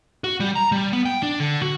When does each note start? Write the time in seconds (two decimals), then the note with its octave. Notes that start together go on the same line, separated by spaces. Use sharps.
0.24 F#4
0.40 G3
0.56 A#5
0.72 G3
0.93 B3
1.05 G5
1.23 D4
1.40 D3
1.62 F#4